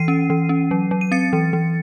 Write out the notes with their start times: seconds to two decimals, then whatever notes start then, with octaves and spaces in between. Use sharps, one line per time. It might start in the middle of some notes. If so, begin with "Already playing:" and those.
Already playing: E3 C7 D#7
0.08 C#4
0.30 E3
0.49 C#4
0.71 F#3
0.91 F#3
1.01 D#7
1.12 C4 A6 C#7
1.33 E3
1.53 E3